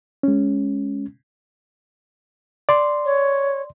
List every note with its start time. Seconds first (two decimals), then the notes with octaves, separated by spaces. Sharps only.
0.23 G#3 C#4
2.69 D5 C6
3.05 C#5